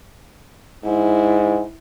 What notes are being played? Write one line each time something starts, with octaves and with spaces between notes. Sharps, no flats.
G#2 E4